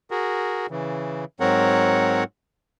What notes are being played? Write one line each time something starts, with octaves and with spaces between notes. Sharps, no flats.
F#4 G#4 A#4
C#3 E3
G#2 F#3 C4 A#4 C#5 F#5